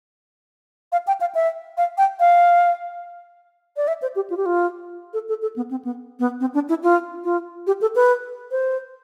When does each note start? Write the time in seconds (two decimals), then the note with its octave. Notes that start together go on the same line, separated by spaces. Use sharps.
0.92 F5
1.07 G5
1.21 F5
1.35 E5
1.77 F5
1.98 G5
2.20 F5
3.77 D5
3.88 E5
4.02 C5
4.16 G4
4.30 F4
4.37 G4
4.46 F4
5.14 A4
5.29 A4
5.42 A4
5.56 B3
5.71 C4
5.85 B3
6.19 B3
6.40 C4
6.54 D4
6.69 E4
6.83 F4
7.24 F4
7.67 G4
7.81 A4
7.95 B4
8.51 C5